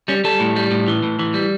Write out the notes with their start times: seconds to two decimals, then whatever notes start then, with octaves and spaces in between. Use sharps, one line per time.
0.08 G3 C#4
0.24 G3 A4
0.40 A2
0.56 G3
0.71 A2
0.88 E3
1.03 A2
1.19 E3
1.34 G3